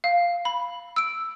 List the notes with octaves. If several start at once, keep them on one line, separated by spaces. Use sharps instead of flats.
F5
B5
E6 D7